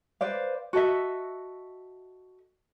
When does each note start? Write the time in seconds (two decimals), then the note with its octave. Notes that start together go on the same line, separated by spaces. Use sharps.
0.21 B4 C5 D5 F5
0.73 F#4 A4 D#5 E5